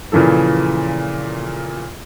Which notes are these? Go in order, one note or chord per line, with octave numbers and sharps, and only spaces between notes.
A#2 C#3 E3 F3 A4